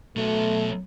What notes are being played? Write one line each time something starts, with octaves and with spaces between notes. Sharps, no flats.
B2 F#3 A3